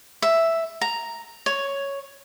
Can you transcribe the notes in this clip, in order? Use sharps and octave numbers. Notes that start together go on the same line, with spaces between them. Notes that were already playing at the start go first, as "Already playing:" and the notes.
E5
A#5
C#5